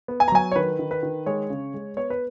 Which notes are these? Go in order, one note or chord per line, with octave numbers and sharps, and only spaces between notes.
B3
G#5
A#5
F#3 G#5
C#5
D#3 B4
D#3
B4
D#3
G#3 C#5
C#3
G#3
B3 C#5
B4